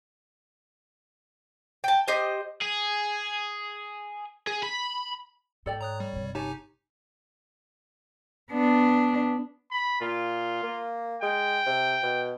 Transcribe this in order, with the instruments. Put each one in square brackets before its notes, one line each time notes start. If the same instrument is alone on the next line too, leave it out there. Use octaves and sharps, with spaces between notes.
[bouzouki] G5 A5
G4 C5 D#5
[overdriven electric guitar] G#4
G#4
B5
[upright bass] G#2 [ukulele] A4 D5 G5
[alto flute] C#5 [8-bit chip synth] A#5 D#6 F#6
[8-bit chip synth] G3
[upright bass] G1 C3
[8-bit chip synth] D#4 G4 G#5 [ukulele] C#5 A5
[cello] B3 D4
[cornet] B5
[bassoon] A#2 [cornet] F4
[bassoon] A#3
[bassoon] G#3 [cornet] G5
[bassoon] C3
B2